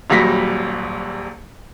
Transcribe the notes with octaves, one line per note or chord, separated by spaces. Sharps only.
D#1 A#1 F#3 G3 A#6 B6